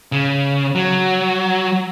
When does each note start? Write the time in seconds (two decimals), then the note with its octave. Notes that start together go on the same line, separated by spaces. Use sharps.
0.12 C#3
0.75 F#3